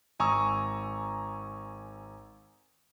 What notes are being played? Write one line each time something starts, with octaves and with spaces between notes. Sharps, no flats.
G#1 G#5 A#5 C#6 D#6 E6